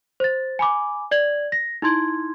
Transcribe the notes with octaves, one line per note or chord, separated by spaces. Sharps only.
C5 A6
G#5 B5 D6
D5 G#6 F#7
A#6
D#4 E4 C6 G#6